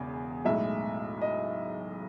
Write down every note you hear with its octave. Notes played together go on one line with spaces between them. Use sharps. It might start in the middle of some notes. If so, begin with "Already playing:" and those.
Already playing: E1 E2 C#3 G#4
B1 A2 G#3 E5
D#5